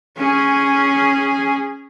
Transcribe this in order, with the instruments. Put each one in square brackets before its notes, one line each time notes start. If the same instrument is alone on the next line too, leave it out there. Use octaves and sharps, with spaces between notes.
[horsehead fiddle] C#4 G#4